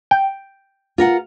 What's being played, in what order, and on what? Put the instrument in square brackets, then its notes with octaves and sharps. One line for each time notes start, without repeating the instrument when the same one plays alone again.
[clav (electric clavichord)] G5
[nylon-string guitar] F4 A#4 F#5